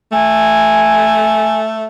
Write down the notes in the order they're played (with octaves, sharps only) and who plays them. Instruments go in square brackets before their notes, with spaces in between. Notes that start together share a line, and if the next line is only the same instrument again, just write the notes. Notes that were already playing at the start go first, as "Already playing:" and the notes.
[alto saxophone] A3 [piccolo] G#5